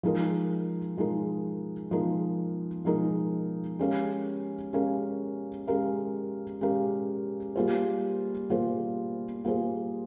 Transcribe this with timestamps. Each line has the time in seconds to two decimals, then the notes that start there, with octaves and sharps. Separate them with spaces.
0.03 F3 G#3 D#4 A#4
0.97 F3 G#3 D#4 A#4
1.91 F3 G#3 D#4 A#4
2.85 F3 G#3 D#4 A#4
3.79 G#3 C#4 G4 A#4 F5
4.73 G#3 C#4 G4 A#4 F5
5.68 G#3 C#4 G4 A#4 F5
6.61 G#3 C#4 G4 A#4 F5
7.56 G3 A#3 F4 G#4 C5
8.49 G3 A#3 F4 G#4 C5
9.44 G3 A#3 F4 G#4 C5